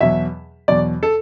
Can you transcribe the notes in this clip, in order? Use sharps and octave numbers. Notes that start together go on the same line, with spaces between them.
E2 B2 F#3 E5
E2 B2 F#3 D5
A4